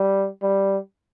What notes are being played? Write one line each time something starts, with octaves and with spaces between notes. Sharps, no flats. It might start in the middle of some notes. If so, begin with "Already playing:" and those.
Already playing: G3
G3